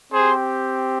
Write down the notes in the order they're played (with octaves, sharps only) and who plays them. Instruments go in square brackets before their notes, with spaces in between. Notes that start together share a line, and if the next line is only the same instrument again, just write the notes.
[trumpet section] C4 G4 G#4 C5